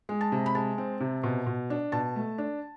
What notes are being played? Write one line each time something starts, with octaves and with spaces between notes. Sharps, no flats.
G#3
A5
C3
B5
G#3 A5
C4
C3
B2
B2
D4
B2 A5
A3
D4